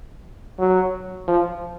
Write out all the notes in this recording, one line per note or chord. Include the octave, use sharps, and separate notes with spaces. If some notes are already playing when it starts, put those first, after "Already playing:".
F#3
F3